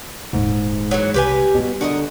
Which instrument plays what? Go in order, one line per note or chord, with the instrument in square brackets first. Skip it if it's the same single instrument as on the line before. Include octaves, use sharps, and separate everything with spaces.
[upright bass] D#1 [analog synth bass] G#2
[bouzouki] E3 F#3
[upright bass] C2 [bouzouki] G4 B4 G#5
[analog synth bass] B2 [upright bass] G3 F4
[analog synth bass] D3 [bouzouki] F#4 A#4 D#5